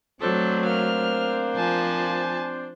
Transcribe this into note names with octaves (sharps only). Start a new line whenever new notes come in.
F#3 A3 C4 D4 A4 C5
A#3 F6
F3 G#5 A5